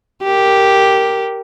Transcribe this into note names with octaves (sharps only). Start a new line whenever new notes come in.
G4 A#4